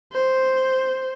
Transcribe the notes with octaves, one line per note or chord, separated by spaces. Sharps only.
C5